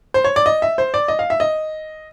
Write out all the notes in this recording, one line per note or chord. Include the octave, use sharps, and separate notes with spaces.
C5
C#5
D5
D#5
E5
C5
D5
D#5
F5
E5
D#5